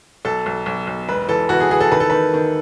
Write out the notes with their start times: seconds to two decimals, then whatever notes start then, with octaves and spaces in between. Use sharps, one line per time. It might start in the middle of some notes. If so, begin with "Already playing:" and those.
0.25 B1 A4
0.46 B1
0.66 B1
0.87 B1
1.09 E1 B4
1.29 E3 A4
1.49 E3 F#4
1.60 G#4
1.70 E3 G#4
1.81 A4
1.92 D#3 B4
2.00 A4
2.10 D#3 B4
2.34 D#3